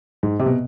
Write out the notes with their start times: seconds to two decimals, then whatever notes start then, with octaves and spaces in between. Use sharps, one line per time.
0.23 G#2
0.39 C3
0.46 B2